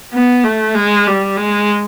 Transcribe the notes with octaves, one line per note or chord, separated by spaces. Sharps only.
B3
A3
G#3
G3
G#3